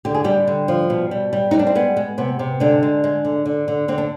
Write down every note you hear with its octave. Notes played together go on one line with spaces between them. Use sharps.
D3 G4
G#4
D3 G3 G4
D3
F3
B2
G3
G3
G3 D#4
D4
C4
G#3 B3
G#3
C3 B3
C3
D3 G#3 D4
G#3
G#3
D3
D3
D3
D3 C4
D4